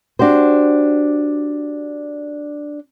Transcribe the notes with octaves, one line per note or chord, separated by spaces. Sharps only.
D4 F#4 G4 C5